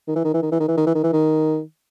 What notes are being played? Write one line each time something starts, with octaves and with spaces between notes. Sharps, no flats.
D#3
E3
D#3
E3
D#3
E3
D#3
E3
D#3
E3
D#3
E3
D#3